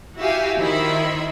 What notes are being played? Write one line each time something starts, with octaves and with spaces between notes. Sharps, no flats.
E4 F#4 G4 E5 F5 G#5
D#3 E4 C5 E5 B5